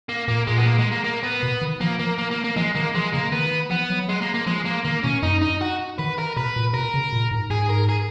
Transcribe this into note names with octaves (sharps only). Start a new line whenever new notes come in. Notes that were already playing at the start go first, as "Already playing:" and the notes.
A#3
A#2 A#3
A#2 G#3
B3
A#3
G#3
A#3
A#3
B3
B2
D#3
F3 A#3
A#3
A#3
A#3
A#3
F3 G#3
D#3 A#3
F3 G#3
C#3 A#3
D#3 B3
F3 B3
F#3
G#3
A#3
A#3
F3 G#3
A#3
D#3 A#3
B2 C#4
F#2 D#4
D#4
F#4
D#3 B4
A#4
B2 B4
A#2
B2 A#4
C#3
A#2
G#2
G#2 G#4
A#4
G#4